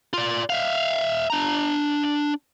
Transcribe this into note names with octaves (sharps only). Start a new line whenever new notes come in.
F4 D5
E5 F5
D4 A#5